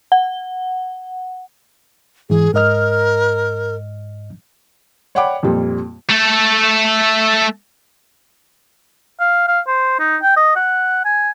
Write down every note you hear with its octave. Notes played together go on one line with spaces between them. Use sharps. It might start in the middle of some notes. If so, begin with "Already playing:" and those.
F#5
G#2 E3 G#4
G#2 A#4 D#5 F6
C#5 D5 F#5 G5 B5 D6
F2 A#2 G3
A3 A4
F5
F5
C5
D#4
G5
D#5
F#5
G#5